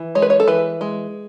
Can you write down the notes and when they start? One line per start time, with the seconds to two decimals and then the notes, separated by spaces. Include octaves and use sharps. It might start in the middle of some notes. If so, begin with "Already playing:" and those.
Already playing: E3
0.15 G#3 C#5
0.22 B4
0.30 C#5
0.40 A4
0.48 E3 B4
0.81 G#3